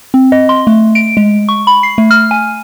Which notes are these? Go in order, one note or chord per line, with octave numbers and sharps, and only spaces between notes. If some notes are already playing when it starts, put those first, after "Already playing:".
C4
D#5
C6
A3
D7
G#3
C#6
B5
C7
A3
F6
G#5